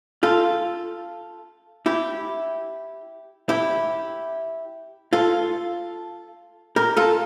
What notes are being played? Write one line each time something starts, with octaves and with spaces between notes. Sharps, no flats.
F4 A4
E4 G4
E4 G4
F4 A4
G4 A#4
F4 A4